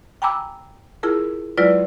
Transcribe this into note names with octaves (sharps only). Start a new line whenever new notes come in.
G5 G#5 A#5 B5 D6 E6
E4 F4 G#4 A#4 A5
F#3 G#3 E4 F4 B4 D5